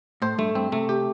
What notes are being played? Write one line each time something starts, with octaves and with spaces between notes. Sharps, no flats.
A2 C5
G2 A3
G2 C4
C3 A3
G4